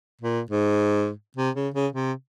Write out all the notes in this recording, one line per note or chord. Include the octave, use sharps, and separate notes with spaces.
A#2
G#2
C3
C#3
C#3
C3